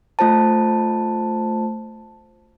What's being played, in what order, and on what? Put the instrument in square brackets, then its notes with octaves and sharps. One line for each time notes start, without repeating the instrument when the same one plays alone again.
[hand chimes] A3 F4 C5 A5